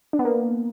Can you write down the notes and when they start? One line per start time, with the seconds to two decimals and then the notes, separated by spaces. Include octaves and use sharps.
0.13 D4
0.19 B3
0.25 A#3